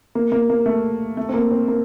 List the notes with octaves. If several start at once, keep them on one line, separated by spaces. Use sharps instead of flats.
A#3
A#3
A#3
A3
A3
C4
A#3
C4
A#3